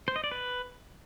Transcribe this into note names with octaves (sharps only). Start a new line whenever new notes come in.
C5
D#5
D5
B4